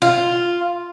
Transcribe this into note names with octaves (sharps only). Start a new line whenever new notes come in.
F4